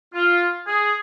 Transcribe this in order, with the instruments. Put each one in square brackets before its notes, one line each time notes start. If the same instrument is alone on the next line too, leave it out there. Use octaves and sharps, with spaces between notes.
[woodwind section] F4
G#4